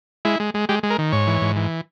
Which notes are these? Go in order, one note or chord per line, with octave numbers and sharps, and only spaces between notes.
G#3 E4
G#3
G#3
G#3 G4
G#3
A#4
D#3
G#2 C#5
E3
G#2
E3